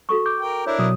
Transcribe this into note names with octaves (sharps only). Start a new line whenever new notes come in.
F#4 A4 C#6
D6 G6
A#4 G5
D4 E4 A#4 C#5
B2 F#3 D#6